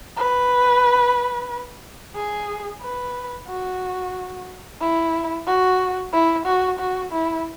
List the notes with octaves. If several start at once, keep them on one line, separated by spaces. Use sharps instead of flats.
B4
G#4
B4
F#4
E4
F#4
E4
F#4
F#4
E4